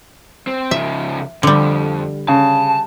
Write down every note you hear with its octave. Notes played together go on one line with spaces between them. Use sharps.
C4
C#3 F3 E5
F2 D3 G3
C#3 A5